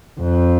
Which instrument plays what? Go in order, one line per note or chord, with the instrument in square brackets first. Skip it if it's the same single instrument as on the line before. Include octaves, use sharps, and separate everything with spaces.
[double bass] F2